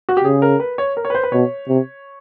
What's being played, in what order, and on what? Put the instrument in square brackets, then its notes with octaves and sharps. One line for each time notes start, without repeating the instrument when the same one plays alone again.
[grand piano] F#4
G4
[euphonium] C#3 [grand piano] G#4
[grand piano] A#4
B4
C#5
A#4
C#5
B4
C5
B4
[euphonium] B2 [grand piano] C#5
[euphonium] C3